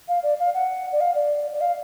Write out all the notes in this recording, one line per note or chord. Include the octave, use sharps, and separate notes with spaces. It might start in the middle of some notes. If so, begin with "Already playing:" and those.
F5
D5
F5
F#5
D5
F5
D5
D5
F5